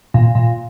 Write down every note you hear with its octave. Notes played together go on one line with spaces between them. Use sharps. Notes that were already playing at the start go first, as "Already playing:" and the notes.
A#2
A#2